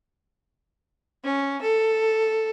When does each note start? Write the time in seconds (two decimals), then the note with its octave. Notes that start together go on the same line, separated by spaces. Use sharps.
1.24 C#4
1.62 A4